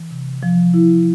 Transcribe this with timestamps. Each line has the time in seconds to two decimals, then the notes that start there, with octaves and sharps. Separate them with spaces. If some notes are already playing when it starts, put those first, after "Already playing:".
Already playing: E3
0.11 C3
0.43 F3
0.74 E4